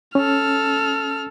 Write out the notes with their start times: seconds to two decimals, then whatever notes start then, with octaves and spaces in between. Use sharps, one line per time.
0.15 C#4 A4 F6